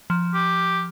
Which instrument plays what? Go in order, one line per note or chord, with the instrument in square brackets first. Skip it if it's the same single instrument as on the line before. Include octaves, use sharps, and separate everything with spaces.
[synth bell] F3
[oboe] G4